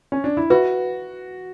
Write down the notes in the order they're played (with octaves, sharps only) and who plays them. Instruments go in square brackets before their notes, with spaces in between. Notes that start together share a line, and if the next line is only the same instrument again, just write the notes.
[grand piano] C#4
D4
E4
[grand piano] F#4 [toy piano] B4 E5 B5